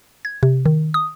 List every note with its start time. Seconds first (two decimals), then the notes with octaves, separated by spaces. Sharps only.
0.25 G#6
0.43 C3
0.66 D#3
0.94 D#6